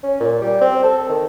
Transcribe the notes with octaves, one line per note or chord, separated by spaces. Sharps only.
C#4
A#2
G3
C4
A4
D#3